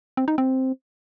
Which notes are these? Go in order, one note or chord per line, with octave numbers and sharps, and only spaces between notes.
C4
D#4
C4